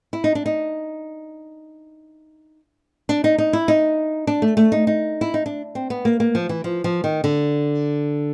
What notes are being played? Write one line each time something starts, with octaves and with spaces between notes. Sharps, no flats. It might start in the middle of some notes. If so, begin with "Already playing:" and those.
E4
D#4
D4
D#4
D4
D#4
D#4
E4
D#4
D4
A3
A3
D#4
D#4
E4
D#4
D4
C4
B3
A#3
A#3
F3
E3
F3
F3
D#3
D3